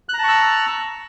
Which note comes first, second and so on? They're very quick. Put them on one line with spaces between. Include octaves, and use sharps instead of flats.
F#6 A#5 A5 C#6 E6